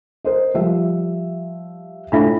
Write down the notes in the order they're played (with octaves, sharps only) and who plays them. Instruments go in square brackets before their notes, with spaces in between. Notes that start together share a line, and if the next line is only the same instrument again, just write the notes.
[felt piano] A#4 C5 D#5
F3 G3 E5
[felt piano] A2 [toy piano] D4 F4 E5